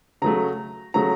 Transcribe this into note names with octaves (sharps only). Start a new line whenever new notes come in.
C#3 F#3 A3 A#5
C#3 F#3 A3 A#5